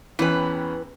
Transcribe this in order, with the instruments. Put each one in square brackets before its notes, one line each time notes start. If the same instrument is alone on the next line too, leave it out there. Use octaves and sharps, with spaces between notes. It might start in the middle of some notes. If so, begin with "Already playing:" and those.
[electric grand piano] E2 C#4 G5 [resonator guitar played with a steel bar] E3 B4